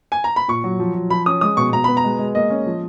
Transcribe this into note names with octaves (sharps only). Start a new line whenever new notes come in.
G#5
A#5
B5
A#2 C#6
F#3
F3
F3
F3 B5
C#4 D#6
G#3 D#6
B2 C#6
B2 A#5
B3 B5
A#5
G#3
G#3
A#3 D#5
C#4
F3